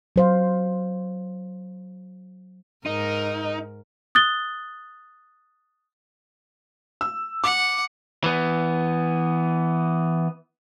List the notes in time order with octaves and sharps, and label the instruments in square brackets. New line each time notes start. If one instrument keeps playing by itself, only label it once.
[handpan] F#3 C5 F5
[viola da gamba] G#2 A#4 [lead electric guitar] D#4
[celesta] D#6 F#6 A6 G7
[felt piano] E6
[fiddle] F#5 [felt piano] D6
[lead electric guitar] E3 B3